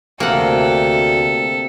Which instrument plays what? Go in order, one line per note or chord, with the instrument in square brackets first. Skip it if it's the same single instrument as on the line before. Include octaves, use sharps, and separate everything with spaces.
[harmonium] D2 [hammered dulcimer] C3 [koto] A#3 F#5 [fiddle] A4